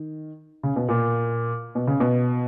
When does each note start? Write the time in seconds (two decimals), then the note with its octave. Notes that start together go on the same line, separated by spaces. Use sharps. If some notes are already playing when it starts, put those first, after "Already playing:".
Already playing: D#3
0.63 C#3
0.76 B2
0.89 A#2
1.75 B2
1.87 C#3
2.00 B2